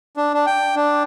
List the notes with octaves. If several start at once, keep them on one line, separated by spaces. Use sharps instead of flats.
D4
D4
G5
D4